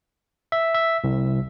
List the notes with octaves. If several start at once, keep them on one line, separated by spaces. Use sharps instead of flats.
E5
E5
C2